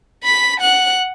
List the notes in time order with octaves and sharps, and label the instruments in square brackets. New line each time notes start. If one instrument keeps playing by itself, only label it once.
[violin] B5 B6
F#5 F#6